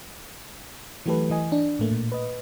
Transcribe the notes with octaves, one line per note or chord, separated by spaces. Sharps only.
E3 F#3 A3 G4 A4 B4
E3 D#5 G#5
D4
A2 A3 A#3
A#2
B4 D#5